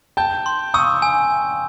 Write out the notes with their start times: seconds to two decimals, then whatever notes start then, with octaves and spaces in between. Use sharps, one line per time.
0.17 G5 A5 G6
0.46 C6
0.74 C#6 D#6 E6
1.02 G#5